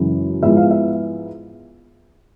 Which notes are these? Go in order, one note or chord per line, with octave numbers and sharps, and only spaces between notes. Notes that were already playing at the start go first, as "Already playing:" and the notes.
Already playing: F#2 C#3 E3 G#3
G#2 F3 G#3 B3 E4 E5
F5
E5